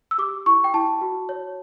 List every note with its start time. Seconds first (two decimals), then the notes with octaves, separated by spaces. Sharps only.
0.11 E6
0.18 G4 D6
0.46 E4 C#6
0.64 G5
0.74 E4 A5
1.01 F#4
1.29 C#5